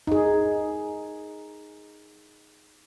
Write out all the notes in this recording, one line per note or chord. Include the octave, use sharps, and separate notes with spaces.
D#4 G#4